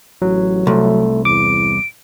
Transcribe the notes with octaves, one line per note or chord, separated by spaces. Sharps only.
A1 F#3
C2 A3
E2 D6 D7